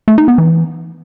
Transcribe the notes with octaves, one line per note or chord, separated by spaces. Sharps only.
A3
D#4
B3
E3